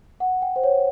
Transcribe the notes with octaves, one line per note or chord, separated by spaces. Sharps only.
F#5
G5
C5
C#5